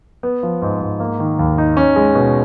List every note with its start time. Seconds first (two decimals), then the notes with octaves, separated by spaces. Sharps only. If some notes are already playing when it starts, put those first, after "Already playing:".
0.23 B3
0.43 F3
0.62 G#2
0.81 G#2
1.00 A#3
1.19 D#3
1.39 D#2
1.58 D#4
1.77 C#4
1.96 G#3
2.15 B2